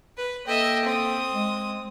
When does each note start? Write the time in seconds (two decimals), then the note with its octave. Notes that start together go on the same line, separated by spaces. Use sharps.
0.18 B4
0.47 A#3 A4 D#5 E5 G5
0.85 C4 D#6
1.32 G#3